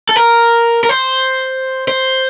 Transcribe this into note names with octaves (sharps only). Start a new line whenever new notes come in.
A4
A#4
A#4
C5
C5